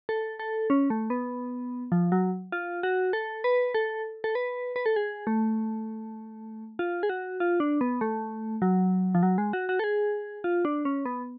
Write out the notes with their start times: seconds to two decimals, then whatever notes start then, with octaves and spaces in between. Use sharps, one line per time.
0.09 A4
0.39 A4
0.70 C#4
0.90 A3
1.10 B3
1.92 F3
2.12 F#3
2.52 F4
2.83 F#4
3.13 A4
3.44 B4
3.74 A4
4.24 A4
4.35 B4
4.76 B4
4.86 A4
4.96 G#4
5.27 A3
6.79 F4
7.03 G#4
7.10 F#4
7.40 F4
7.60 D4
7.81 B3
8.01 A3
8.62 F#3
9.15 F3
9.23 F#3
9.38 G#3
9.53 F#4
9.69 F#4
9.79 A4
9.84 G#4
10.44 F4
10.65 D4
10.85 C#4
11.05 B3